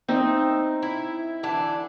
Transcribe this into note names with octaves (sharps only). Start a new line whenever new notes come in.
C4 D#4 E5
E4
D3 E3 D4